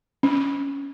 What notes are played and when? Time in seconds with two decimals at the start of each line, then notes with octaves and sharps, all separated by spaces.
0.23 C#4